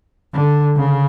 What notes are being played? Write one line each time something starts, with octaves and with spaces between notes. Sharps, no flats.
D3
C#3